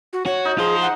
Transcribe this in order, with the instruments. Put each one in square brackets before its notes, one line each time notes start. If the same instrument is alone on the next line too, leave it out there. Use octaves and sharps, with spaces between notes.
[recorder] F#4
[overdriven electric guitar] F#4 [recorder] C#5
[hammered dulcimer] D#4
[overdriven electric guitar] F4 C5 [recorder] G#4
[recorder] F#5